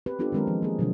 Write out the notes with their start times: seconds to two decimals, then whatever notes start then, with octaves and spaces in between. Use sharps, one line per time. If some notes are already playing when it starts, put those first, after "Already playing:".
0.06 C4 G4 B4
0.19 B3 D4 F4 G4 A4
0.32 D#3 F#3 G#3 C4 A#4
0.47 F3
0.62 A#3 G#4
0.79 B2 D3 F3 F#3 G#3 D4